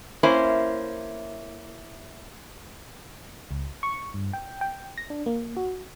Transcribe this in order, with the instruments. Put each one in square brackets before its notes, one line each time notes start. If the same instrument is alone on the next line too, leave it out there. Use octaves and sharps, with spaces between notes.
[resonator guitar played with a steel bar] A#3 C#4 E4 C5
[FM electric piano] C#2
C#6
G2
G5
G5
A#6
D4
A#3
F#4